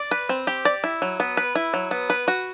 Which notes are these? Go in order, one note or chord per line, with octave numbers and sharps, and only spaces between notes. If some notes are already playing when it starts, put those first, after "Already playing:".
Already playing: D5
B4
C4
G4
D5
E4
F#3
B3
B4
E4
F#3
B3
B4
F#4